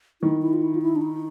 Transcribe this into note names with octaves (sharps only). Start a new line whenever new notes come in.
D#3 E4
E4
F4
E4
F4
E4
D4
D#4